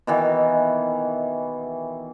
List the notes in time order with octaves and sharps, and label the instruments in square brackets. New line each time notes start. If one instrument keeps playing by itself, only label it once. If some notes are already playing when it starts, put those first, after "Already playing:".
[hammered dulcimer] B2 D#3 E3